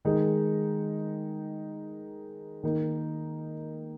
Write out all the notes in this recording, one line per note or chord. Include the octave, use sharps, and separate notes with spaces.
D#3 G#3 D#4 G#4
D#3 A#3 D#4